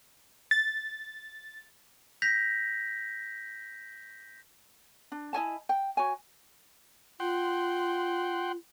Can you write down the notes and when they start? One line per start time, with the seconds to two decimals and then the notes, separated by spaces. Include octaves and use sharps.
0.51 A6
2.22 G6 A#6 B6 F7
5.12 D4
5.33 E4 D#5 G#5 A5
5.69 G5
5.97 F#4 C#5 G#5
7.20 F4 F#5 G5 C6